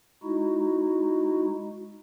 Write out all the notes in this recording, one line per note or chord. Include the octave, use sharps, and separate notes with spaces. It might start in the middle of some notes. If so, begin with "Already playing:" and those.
G#3 D#4 E4 F#4